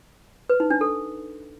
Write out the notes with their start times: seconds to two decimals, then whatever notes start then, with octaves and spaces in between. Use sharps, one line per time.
0.49 B4
0.60 D#4
0.70 D4
0.81 A4